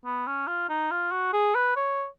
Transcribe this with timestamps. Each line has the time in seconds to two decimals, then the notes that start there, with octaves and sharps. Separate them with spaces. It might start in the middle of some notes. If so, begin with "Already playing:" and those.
0.05 B3
0.27 C#4
0.47 F4
0.69 D#4
0.91 F4
1.11 F#4
1.33 G#4
1.55 B4
1.76 C#5